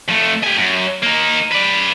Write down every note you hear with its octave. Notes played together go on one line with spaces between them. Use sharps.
F2 A3
G4 G#5
F#2
A#3 D#4
B4 D5